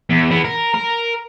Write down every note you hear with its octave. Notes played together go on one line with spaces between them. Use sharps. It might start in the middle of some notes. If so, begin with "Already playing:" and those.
E2
E3 B3
A#4
A#4